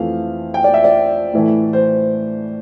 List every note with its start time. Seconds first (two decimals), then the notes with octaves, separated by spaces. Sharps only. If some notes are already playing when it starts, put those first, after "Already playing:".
Already playing: F2 E3 A3 F5
0.54 G5
0.64 D5
0.74 E5
0.84 D5
1.33 A2 E3 A3
1.73 C5